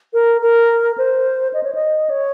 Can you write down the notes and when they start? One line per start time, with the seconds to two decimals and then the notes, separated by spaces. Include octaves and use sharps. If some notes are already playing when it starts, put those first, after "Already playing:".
0.13 A#4
0.41 A#4
0.98 C5
1.53 D#5
1.63 C#5
1.75 D#5
2.10 C#5